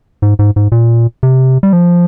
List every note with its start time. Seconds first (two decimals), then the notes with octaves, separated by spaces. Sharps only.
0.22 G#2
0.39 G#2
0.56 G#2
0.72 A#2
1.23 C3
1.63 G3
1.73 F3